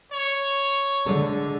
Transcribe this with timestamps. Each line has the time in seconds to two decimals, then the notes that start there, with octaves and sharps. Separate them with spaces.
0.10 C#5
1.06 D3 G#3 A4